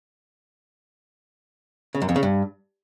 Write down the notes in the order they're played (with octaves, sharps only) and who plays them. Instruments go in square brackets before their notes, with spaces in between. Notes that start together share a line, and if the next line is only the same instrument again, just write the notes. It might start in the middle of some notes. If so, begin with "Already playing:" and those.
[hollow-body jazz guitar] C#3
F#2
F2
C#3
G2